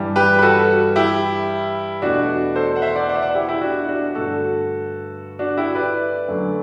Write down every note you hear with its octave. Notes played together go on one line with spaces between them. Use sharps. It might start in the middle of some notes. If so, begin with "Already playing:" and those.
Already playing: G2 E3 G3
G4 B4
B4
F#4 A4
E4 G4
E2 B2 A3 D4 F#4
A4 C5
F#5
C5 E5
D5 F#5
D5 F#5
E5
D5 F#5
E4 G4
E4 G4
D4 F#4
D4 F#4
G2 D3 A3 F#4 A4
D4 F#4
E4 G4
B4 D5
F#2 D3 F#3 A3